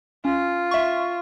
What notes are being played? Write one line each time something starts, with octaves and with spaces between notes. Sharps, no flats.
C#4 F4
E5 C#6